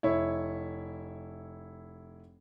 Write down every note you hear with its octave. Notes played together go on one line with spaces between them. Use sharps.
F1 E4 C#5